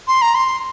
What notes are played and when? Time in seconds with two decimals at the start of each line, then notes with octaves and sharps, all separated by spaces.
0.08 C6
0.22 A#5
0.35 C6